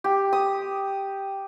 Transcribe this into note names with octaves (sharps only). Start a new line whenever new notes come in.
G4
D#6